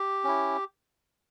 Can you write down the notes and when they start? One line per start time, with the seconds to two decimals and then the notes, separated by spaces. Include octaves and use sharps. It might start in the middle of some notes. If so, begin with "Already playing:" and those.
Already playing: G4
0.24 C#4 E4